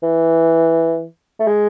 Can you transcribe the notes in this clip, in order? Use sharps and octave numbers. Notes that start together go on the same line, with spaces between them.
E3
A3
G#3